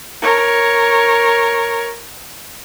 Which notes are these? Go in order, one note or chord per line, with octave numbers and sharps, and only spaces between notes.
A#4 C#5